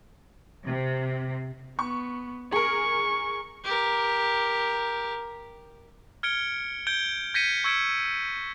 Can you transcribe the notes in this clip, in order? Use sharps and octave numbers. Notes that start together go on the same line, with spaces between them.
C3
B3 C#6
G#4 A#4 C#6
G4 A#4
F6 G#6 C#7 D7 G7
G6 G#6 D7 G7
G6 G#6 A#6 B6 C#7 D#7
C#6 E6 G#6 C#7 D7 E7